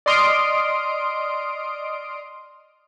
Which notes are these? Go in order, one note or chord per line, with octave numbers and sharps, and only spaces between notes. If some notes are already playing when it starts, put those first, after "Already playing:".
D5 D#5 C6 D#6 F6 D7